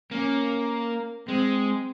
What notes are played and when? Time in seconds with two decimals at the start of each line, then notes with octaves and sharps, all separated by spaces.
0.11 A#3 C#4
1.28 G#3 C4